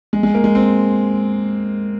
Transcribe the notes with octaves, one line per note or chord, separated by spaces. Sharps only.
G#3
G#3
A#3
G#3
C4